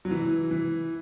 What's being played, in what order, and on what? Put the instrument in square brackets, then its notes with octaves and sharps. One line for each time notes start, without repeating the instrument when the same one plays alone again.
[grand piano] F#3
E3
E3